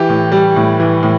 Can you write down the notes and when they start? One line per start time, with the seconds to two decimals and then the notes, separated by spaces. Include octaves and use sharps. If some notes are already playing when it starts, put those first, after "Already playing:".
Already playing: E3 G4
0.09 A2
0.32 G3
0.56 A2
0.80 E3
1.03 A2